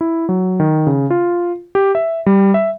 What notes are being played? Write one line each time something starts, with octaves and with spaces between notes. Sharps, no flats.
E4
F#3
D#3
C#3
F4
G4
E5
G3
E5